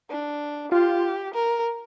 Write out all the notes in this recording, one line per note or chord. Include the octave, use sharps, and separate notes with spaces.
D4
F4 G4
A#4